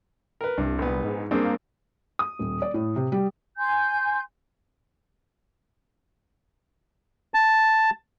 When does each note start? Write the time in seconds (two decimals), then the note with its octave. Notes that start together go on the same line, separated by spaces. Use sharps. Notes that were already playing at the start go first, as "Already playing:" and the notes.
0.41 A#4 B4
0.58 C2 G2 C3
0.78 A#1 B3
1.04 G#2
1.31 G2 A#3 C4 G#4
2.19 D#6
2.39 D#1
2.62 D5
2.74 A2
2.96 C3
3.12 G3
3.57 G#5 C6 G6
7.34 A5